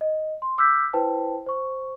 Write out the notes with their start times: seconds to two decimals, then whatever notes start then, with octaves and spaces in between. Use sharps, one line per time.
0.01 D#5
0.42 C6
0.58 D6 E6 F6 G6 B6
0.93 E4 B4 C5 G5 A5
1.46 C5 C#6